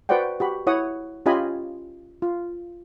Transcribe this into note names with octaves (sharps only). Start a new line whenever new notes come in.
F#4 B4 C5 D5 F#5 G5
F#4 G4 B5
E4 C#5 F#5 D#6
C#4 F4 G4 D#5 G#5 B5
F4